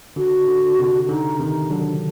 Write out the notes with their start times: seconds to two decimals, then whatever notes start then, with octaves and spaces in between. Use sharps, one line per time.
0.16 D3 F#4
0.47 D3
0.79 C3
1.09 D3 D#4
1.39 C3 D#3 D#4
1.70 D3 F#3 D4